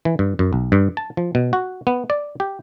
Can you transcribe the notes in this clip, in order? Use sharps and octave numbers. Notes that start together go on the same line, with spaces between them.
E3
G2
F#2
B1
G2
A5
F3
B2
F#4
B3
D5
G4